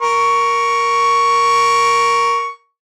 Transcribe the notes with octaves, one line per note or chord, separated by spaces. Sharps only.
A#4 C#6